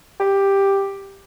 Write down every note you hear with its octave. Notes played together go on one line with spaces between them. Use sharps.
G4